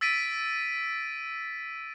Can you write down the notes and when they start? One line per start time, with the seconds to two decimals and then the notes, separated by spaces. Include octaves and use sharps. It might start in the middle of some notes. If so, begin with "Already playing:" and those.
0.01 E6 A6 B6 D7 D#7